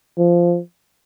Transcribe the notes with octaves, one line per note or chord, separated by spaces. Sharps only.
F3